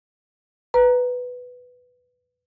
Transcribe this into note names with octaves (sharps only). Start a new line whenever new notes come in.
B4 A#5